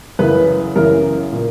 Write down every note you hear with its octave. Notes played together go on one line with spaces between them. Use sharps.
F#2 C#3 E3 B4
F#2 C#3 E3 A#4
A#2